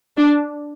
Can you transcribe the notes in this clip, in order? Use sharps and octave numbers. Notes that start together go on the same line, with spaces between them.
D4